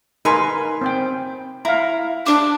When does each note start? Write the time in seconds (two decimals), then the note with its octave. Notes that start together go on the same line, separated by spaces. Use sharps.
0.25 D#4 A#4 B4 G#5 C6
0.81 C4 C5 G5
1.65 E4 F5 A#5
2.26 D4 D5 D6